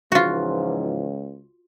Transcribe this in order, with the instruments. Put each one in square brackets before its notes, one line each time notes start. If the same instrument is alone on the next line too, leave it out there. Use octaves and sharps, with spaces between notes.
[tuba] C#2 [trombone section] G#2 E3 F3 [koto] F4 F#4